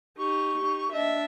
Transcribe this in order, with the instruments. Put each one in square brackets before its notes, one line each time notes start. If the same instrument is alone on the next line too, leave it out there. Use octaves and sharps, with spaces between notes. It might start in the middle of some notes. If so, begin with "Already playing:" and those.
[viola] D#4 G4 [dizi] C#6
[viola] D#4 G4
[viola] D4 E5 [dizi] D#5